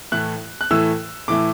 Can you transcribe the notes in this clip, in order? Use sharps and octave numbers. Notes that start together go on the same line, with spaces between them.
A2 E3 A3 F#6
F#6
A2 E3 A3 E6
A2 E3 A3 D6